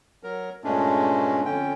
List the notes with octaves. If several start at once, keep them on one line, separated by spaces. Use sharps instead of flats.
F#3 A#4
G2 A#2 G#3 A3 C#4 D4
F2 D3 C#4 G5